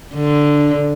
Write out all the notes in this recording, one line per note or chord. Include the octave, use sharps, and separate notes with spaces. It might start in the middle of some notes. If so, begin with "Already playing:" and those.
D3